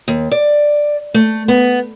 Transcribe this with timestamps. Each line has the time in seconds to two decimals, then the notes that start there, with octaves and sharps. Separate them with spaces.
0.08 D#2
0.31 D5
1.14 A3
1.48 B3